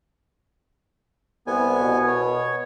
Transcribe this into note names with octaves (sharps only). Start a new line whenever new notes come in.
C2 B3 G#5
B2
C#5